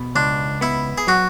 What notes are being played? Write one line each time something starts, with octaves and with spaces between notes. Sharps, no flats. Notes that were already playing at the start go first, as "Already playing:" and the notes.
Already playing: B2
C#2 D4
B3 E4
G#4
F#3 F#4